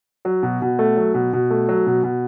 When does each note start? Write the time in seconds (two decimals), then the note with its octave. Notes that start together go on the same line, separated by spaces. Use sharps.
0.25 F#3
0.43 B2
0.62 B2
0.79 A3
0.97 F#3
1.14 B2
1.33 B2
1.50 A3
1.68 F#3
1.87 B2
2.03 B2